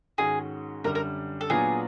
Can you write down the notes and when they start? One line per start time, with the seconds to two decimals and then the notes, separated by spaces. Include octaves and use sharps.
0.18 G#2 D#3 G#3 C#4 F#4 G#4
0.84 F#2 D3 G3 A#4
0.95 A#4
1.41 A4
1.50 A#2 F#3 B3 D4 F4 G#4